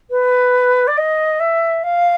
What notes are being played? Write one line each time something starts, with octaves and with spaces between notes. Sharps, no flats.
B4
D5
D#5
E5
F5